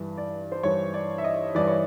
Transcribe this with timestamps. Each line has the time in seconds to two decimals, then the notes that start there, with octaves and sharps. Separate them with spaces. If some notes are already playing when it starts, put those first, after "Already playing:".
Already playing: G2 E3
0.18 D5
0.52 C5
0.63 G2 E3 C#5
0.94 D5
1.18 E5
1.24 D#5
1.55 G2 E3 D5
1.68 C#5